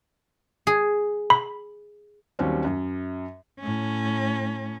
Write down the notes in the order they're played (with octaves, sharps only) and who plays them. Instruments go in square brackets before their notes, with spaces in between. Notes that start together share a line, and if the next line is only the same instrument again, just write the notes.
[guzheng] G#4
[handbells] B5
[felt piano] D#2 F#3 G3 C4 C#4
F#2
[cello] A2 C#4